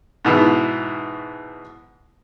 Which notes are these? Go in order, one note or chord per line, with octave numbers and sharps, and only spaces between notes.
G#2 B2 E3